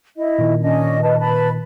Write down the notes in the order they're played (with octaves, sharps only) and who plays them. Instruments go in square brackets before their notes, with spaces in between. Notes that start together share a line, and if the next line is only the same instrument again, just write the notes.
[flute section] E4 D#5
[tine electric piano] A#2 D#3
[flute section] C#4 D4 D#5
B4 D#5 A5
B4 A5 B5